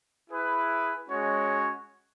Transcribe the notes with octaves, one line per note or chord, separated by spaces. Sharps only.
E4 G#4 B4
G#3 C#4 F#4 C#5